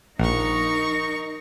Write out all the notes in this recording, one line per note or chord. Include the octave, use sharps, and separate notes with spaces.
A#1 D#4 A#4 C#6